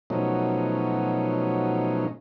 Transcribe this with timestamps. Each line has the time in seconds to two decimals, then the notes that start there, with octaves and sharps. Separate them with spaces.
0.10 B2 F3 F#3 A3 C#4 D#4